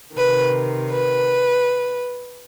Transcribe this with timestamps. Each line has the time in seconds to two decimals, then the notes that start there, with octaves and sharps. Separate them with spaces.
0.15 C3 D#3 B4
0.90 B4